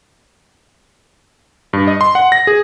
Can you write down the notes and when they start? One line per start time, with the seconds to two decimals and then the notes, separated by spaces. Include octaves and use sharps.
1.73 G2
1.87 D#5
2.01 C6
2.15 F#5
2.32 A#6
2.47 G#4